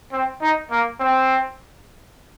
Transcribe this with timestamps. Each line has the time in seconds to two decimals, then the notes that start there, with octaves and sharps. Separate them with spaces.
0.12 C4
0.42 D#4
0.71 A#3
1.00 C4